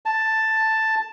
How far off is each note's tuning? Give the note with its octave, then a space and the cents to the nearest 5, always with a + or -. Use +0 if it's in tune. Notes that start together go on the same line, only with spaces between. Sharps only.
A5 +5